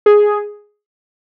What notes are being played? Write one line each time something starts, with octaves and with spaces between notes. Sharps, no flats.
G#4